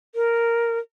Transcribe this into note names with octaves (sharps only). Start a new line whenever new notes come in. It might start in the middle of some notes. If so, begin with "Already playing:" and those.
A#4